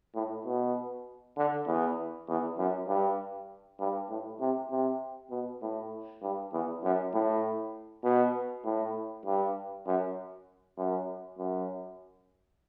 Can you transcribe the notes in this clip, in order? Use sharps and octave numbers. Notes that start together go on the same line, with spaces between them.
A2
B2
D3
E2
E2
F#2
G2
G2
A2
C3
C3
B2
A2
G2
E2
F#2
A2
B2
A2
G2
F#2
F#2
F#2